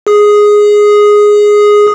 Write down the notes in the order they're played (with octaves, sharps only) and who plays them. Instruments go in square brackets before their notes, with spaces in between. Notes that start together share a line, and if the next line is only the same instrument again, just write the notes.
[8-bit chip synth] G#4 D#6